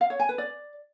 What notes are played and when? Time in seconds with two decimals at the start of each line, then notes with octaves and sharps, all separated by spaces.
0.01 F5
0.10 C#5
0.20 G#5
0.29 B4
0.38 D5